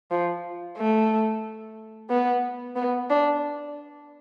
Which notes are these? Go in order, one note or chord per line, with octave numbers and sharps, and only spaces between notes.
F3
A3
B3
B3
D4